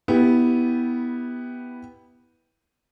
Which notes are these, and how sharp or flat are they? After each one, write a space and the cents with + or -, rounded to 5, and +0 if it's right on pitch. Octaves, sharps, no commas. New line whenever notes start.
B3 +0 E4 -15 G4 +0